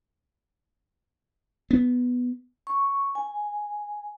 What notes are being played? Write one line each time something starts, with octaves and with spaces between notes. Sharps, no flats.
B3
C#6
G#5